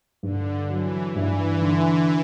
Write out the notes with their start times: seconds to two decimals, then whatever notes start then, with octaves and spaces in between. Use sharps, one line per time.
0.23 G2 D3
0.69 E3 F#3
1.15 G2 E3
1.62 D3